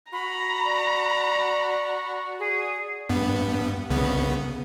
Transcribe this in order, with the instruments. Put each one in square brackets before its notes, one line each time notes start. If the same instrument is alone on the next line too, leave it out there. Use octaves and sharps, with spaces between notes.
[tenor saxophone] F#4 [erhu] A#5 [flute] B5
[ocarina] D5
[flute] G#4
[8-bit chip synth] G2 B3
C2 C#3 B3